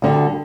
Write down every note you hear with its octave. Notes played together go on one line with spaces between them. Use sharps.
D2 D3 G3